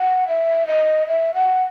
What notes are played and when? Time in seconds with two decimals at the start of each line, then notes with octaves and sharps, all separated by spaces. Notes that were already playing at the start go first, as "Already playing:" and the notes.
Already playing: F#5
0.28 E5
0.67 D#5
1.07 E5
1.34 F#5